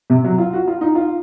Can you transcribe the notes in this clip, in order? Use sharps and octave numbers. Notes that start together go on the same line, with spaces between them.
C3
F#3
F4
F#4
F4
D#4
F4